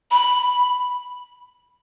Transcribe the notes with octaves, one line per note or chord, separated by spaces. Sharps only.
B5